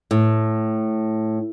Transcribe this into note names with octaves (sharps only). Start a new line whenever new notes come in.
A2